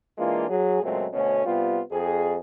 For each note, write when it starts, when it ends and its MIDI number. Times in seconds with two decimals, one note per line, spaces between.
0.18 0.49 52
0.18 0.49 56
0.18 0.49 58
0.18 0.49 62
0.18 0.49 65
0.50 0.81 54
0.50 0.81 68
0.82 1.07 37
0.82 1.07 46
0.82 1.07 54
0.82 1.07 56
0.82 1.07 57
0.82 1.07 60
1.13 1.43 38
1.13 1.43 47
1.13 1.43 57
1.13 1.43 61
1.46 1.81 48
1.46 1.81 55
1.46 1.81 59
1.46 1.81 65
1.92 2.37 41
1.92 2.37 68